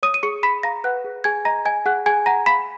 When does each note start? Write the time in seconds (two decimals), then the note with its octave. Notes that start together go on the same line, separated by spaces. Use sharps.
0.03 C#5 D#6 D#7
0.14 D#7
0.23 G#4 C#6 C#7
0.43 G#4 B5 B6
0.63 F5 A#5 A#6
0.84 B4 F#5 F#6
1.04 G#4
1.24 G#4 G#5 G#6
1.45 D#5 A#5 A#6
1.65 D#5 G#5 G#6
1.86 G#4 F#5 F#6
2.06 G#4 G#5 G#6
2.26 F#5 A#5 A#6
2.46 F5 B5 B6